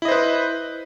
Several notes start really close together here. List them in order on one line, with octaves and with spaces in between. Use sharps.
E4 D#5 C5 B4